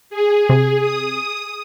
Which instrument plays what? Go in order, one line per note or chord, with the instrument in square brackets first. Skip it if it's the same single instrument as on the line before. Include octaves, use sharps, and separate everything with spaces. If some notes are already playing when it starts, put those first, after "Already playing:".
[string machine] G#4
[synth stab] C3
[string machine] D#6